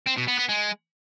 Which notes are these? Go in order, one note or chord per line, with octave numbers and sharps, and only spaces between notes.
C4
B2
B3
B3
G#3